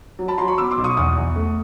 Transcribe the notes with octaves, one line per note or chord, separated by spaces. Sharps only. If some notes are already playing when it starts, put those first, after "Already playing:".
F#3
A5 B5
F#3 A#5 C6
B5 C#6
B3 D6 E6
C6 D6
B1
C#6 D#6
E2 C#6 D#6
E2
A3